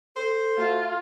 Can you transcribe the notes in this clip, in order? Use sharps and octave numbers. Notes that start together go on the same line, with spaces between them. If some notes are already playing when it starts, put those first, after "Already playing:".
A4 C5
A3 F4 F#4